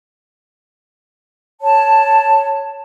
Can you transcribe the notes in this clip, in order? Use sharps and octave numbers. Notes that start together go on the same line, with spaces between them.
C#5 A5